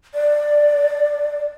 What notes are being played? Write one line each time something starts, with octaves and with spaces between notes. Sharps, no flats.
D5